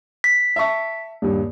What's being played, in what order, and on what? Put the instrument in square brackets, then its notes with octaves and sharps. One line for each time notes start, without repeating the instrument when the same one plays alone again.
[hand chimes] B6
[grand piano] E5 A5 C#6
D#1 G2